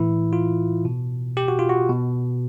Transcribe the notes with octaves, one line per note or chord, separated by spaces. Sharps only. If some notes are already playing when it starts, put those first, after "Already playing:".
Already playing: A2 E3 E4
F4
B2
G4
F#4
F4
F#4
B2